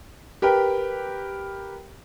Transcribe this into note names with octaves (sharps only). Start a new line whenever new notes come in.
G4 A#4 B4 G5